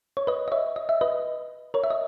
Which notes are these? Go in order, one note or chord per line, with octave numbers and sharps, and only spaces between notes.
C#5
B4 D#5
D#5
C#5 E5
D#5
E5
B4 D#5
A#4 C#5
E5
D#5